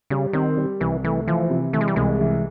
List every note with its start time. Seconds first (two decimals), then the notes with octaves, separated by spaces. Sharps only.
0.10 C#3 G3
0.33 D#3 C4
0.57 G3
0.80 C2 E3
1.04 E3 A3
1.27 E3 F3
1.50 C3
1.73 E3 A3
1.81 G#3
1.88 G3
1.96 C2 G#3
2.21 E3